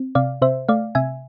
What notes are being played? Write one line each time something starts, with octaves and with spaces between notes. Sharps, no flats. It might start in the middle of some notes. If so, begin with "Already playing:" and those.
Already playing: C4
C3 D5 F5
C3 C5 E5
A3 D5 F5
C3 E5 G#5